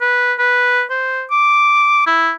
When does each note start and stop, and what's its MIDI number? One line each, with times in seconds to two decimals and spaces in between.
0.01 0.34 71
0.39 0.84 71
0.90 1.24 72
1.31 2.03 86
2.07 2.32 64